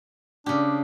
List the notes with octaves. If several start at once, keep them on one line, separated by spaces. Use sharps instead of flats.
C#3 D4 G4